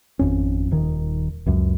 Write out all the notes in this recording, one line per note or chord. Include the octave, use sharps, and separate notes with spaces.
G#1 F2 C#4
D#1 D#3
C#2 F#2